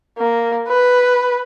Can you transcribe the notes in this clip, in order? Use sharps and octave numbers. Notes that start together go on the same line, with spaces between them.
A#3
B4